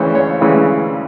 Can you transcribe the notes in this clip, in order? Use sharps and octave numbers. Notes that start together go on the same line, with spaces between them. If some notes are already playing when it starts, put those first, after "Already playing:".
Already playing: D2 C#3 E3 C5 C#5
C#5
D2 C#3 E3